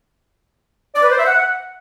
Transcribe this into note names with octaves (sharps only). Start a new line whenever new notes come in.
D5
B4
C5
E5
F#5